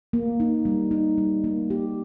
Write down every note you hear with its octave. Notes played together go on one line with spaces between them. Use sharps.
A#3
D#4
G3
D#4
G3
A#3
G4